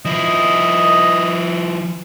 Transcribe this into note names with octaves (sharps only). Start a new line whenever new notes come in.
F3 E4 D#5